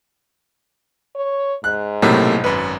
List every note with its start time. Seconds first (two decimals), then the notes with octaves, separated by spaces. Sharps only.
1.15 C#5
1.64 G#2 F#6
2.02 B1 A2 C3 A3 A#3
2.44 G#1 F#2 B4